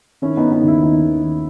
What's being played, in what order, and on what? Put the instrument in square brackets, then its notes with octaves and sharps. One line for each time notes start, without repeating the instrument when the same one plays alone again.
[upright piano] D#3 C#4 E4
B3 D#4
D#3
B3 D#4
D#2
C#4 E4
D#2 B3 D#4
D#3
D#3